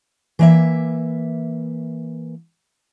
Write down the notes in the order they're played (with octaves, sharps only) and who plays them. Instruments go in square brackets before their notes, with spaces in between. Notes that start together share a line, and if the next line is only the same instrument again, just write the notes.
[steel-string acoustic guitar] E3 A#3 E5